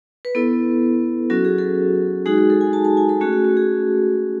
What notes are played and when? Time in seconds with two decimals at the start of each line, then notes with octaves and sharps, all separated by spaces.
0.25 B4
0.35 B3 E4 A4
1.30 F#3 C#4 F#4 A4
1.45 G#4
1.58 A4
2.26 G#3 D#4 F#4 G#4
2.38 G#4
2.50 A4
2.61 G#5
2.73 A5
2.85 A5
2.97 G#5
3.09 A4
3.21 A3 C#4 F#4 G#4
3.33 F#4
3.45 F#4
3.57 G#4